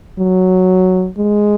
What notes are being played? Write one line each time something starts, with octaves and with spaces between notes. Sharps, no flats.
F#3
G#3